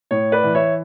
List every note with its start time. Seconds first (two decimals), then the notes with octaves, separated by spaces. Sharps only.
0.11 A2 C#5
0.32 B4 D5
0.43 E3
0.55 C#5 E5